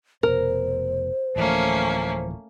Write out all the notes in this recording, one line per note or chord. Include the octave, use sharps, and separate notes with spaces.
F1 B2 A#4 C5
D1 E3 F3 A3 A#3 C#4